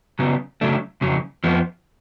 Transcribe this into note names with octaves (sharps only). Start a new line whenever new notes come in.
C#3 F#3 B3
C#3 F#3 A3 D4
F2 C#3 F#3
F2 F3 B3